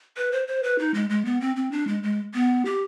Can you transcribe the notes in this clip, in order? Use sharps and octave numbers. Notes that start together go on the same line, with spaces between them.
B4
C5
C5
B4
D#4
G#3
G#3
B3
C4
C4
D4
G#3
G#3
B3
G4